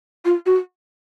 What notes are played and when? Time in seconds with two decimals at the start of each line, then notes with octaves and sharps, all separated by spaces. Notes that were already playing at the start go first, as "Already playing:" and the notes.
0.25 F4
0.46 F#4